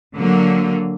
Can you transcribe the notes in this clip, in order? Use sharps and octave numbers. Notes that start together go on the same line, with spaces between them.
D3 F#3 A#3